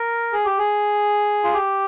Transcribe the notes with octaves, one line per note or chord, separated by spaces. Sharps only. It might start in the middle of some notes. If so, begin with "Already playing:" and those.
Already playing: A#4
G#4
G4
G#4
F4
G4